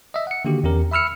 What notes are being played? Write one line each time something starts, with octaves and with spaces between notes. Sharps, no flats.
D#5 E5
F#5 C#7
D3 D#3 A#3 F#4 G4
E2 C#4 G4 A#4
E5 B5 E6 F6 C#7